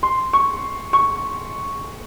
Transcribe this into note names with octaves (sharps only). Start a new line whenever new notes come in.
C6
C#6
C#6